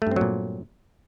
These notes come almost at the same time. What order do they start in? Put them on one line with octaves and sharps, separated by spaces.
A3 G2 C4 F#3 A#2